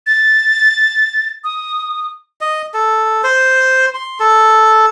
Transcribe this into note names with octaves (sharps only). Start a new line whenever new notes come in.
A6
D#6
D#5
A4
C5
C6
A4